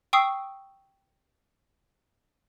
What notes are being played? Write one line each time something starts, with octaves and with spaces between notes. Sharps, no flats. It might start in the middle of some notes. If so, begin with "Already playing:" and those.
G5 C#6 D#6 E6 C7